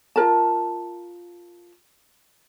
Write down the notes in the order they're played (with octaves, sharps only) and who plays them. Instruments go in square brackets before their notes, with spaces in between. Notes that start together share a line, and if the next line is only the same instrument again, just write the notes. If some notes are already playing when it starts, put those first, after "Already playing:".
[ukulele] F4 A#4 A5